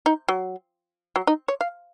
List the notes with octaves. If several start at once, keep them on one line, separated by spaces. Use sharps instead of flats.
D#4
F#3
F#3
D#4
C#5
F5